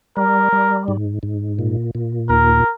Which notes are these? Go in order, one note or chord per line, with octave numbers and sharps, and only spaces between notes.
G3 A#4
G3
G#2
G#2
A#2
A#2
D#2 A#4